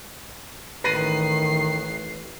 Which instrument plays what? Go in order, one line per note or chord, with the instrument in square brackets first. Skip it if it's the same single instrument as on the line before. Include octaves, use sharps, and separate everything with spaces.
[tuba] A1 [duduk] D#3 [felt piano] B4 A#6 D#7 [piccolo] C7